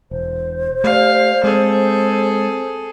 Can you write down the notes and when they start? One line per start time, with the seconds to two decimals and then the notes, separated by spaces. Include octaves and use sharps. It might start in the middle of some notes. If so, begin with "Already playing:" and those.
0.11 E1 C5
0.84 A3 G4 D5 F5
1.44 G#3 C4 G#4 A4